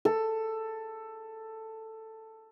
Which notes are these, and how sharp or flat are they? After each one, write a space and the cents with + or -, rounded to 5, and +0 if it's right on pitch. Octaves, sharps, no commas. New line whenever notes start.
A4 +10